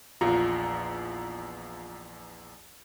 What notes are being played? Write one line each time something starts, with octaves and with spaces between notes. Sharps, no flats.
A#1 E2 F4 A#5